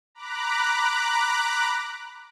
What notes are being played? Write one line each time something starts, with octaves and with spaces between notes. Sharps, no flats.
A#5 B5 D6 F#6